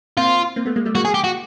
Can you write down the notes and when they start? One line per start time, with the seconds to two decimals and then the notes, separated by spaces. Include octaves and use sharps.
0.17 A#3 C4 F4
0.56 A#3 C4
0.65 A3 B3
0.76 G#3 A#3
0.85 G3 A3
0.95 G#3 A#3 F#4
1.05 G#4
1.14 G4
1.24 F#4